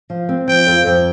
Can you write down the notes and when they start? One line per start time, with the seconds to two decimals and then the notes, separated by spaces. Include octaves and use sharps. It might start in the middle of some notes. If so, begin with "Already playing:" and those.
0.10 F3
0.29 C4
0.47 F3 G5
0.67 F2
0.86 F2